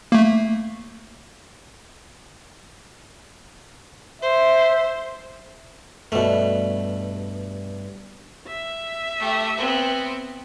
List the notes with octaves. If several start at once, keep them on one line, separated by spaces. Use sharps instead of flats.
A3 A#3
C5 E5
G2 B2 A3
E5
A3 G4
B3 C4